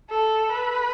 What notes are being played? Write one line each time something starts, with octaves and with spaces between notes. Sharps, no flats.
A4
B4